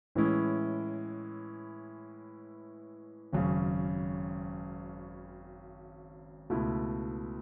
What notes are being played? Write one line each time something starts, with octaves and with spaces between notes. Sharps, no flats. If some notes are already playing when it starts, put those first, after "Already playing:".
A2 E3 G#3 C#4 E4
G#1 F#2 C#3
C#2 B2 A3 E4